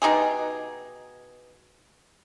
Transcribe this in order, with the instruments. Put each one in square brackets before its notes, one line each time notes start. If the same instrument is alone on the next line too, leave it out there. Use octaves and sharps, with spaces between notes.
[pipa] B2 D#4 G4 G#4